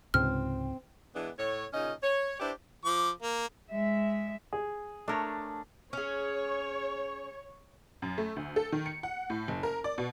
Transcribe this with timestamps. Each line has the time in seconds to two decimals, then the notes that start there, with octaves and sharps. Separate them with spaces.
0.14 C#2 G#2 C3 C4 F6
1.15 E3 G#3 B3 D4
1.38 A2 C#5
1.73 A#2 C#3 C#4 D#4 D#5
2.02 C#5
2.40 D4 E4 G4 B4 C5
2.85 F3 D6
3.22 A#3
3.70 G#3 E5
4.53 G#4
5.08 A3 D4 A#4 C#5
5.93 C#4 G#4 C#5
8.02 F#2
8.18 A3
8.36 D2
8.56 A4
8.72 D#3
8.86 C#7
9.03 F#5
9.30 A2
9.48 F#1
9.63 A#4
9.84 D5
9.98 B2